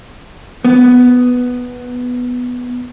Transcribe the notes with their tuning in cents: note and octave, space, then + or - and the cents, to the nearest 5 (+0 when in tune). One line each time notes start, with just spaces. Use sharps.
B3 +0